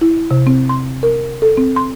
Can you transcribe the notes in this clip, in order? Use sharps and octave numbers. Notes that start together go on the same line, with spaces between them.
E4
C3
C4
C6
A#4
A4
C4
C6